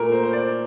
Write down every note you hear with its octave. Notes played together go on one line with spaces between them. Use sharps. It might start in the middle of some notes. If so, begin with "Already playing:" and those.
Already playing: A#2 A3 A#4
C5
C5
D5